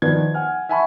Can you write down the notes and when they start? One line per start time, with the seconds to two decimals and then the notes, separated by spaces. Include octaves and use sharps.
0.02 D#3 F3 B4 D5 G#6
0.34 F#5 G#5 F6
0.69 E5 F#5 G#5 A5 B5 C#6